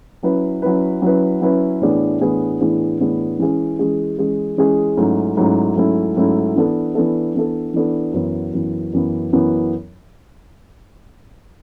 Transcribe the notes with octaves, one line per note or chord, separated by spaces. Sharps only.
F#3 C#4 E4 B4
F#3 C#4 E4 B4
F#3 C#4 E4 B4
F#3 C#4 E4 B4
A2 E3 B3 D4 G#4
A2 E3 B3 D4 G#4
A2 E3 B3 D4 G#4
A2 E3 B3 D4 G#4
E3 G#3 C#4 G#4
E3 G#3 C#4 G#4
E3 G#3 C#4 G#4
E3 G#3 C#4 G#4
G#2 F#3 A3 C#4 E4
G#2 F#3 A3 C#4 E4
G#2 F#3 A3 C#4 E4
G#2 F#3 A3 C#4 E4
E3 B3 D4 A4
E3 B3 D4 A4
E3 B3 D4 A4
E3 B3 D4 A4
F#2 E3 B3
F#2 E3 B3
F#2 E3 B3
F#2 E3 B3